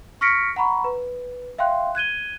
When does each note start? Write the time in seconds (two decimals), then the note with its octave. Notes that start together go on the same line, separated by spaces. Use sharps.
0.21 C#6 F6 A#6 B6 C#7 D7
0.56 F#5 A#5 B5 C#6
0.84 B4
1.58 E5 F5 G5 C6 F#6
1.95 F#6 G#6 D#7 G7